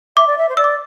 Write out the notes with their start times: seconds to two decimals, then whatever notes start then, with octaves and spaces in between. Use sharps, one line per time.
0.17 E5 D6
0.27 D5
0.38 E5
0.49 C5
0.57 D5 E6
0.64 D6